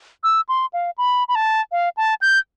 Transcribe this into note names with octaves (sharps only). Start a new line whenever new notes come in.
E6
C6
F5
B5
B5
A5
F5
A5
G6